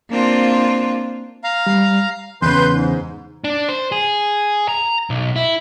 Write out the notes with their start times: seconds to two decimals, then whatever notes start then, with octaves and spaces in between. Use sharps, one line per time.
0.11 A#3 C4 D4 F4
1.44 F5 A#5
1.67 G3
2.42 E2 C#3 B4 C6 G6
2.71 G#2
3.44 D4
3.69 C5
3.92 G#4
4.69 A#5
5.10 B1
5.36 E4